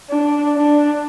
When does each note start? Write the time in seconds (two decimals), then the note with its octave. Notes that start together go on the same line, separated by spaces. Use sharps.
0.10 D4
0.56 D4